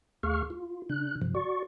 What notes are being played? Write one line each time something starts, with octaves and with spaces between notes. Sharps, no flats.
D#2 A3 G#4 F5 C#6 F6
F4
C#3 D4 F#6
G2 C3 F3
F#4 D5 C#6